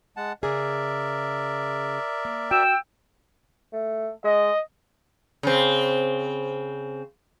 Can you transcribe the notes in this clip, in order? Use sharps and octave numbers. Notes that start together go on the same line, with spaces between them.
G#3 F#5 A5
C#3 G#4 A#4 D5 E5
A#3
F#4 G5 E6
A3
G#3 D#5
C#3 C4